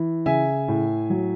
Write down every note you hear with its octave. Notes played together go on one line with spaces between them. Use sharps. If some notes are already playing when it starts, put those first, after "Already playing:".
Already playing: E3
C#3 E5 G#5
A2
F#3